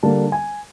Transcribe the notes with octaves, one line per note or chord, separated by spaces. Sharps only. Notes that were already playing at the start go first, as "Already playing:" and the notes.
D3 G3 A#3 A5
G#5